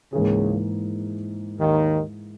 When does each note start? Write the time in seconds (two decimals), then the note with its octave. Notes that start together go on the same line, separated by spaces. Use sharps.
0.13 C#2 G#2 C#3 E3 A#3 E4 G#4
1.58 D#2 D#3